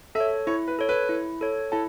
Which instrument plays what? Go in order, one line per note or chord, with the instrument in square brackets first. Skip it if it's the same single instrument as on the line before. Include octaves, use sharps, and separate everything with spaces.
[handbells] A4 [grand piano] E5
[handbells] C#5
[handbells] E4 [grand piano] C#5
[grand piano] B4
[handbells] A4 C#5
[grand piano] B4
[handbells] E4
A4 C#5
[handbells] E4 [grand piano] A4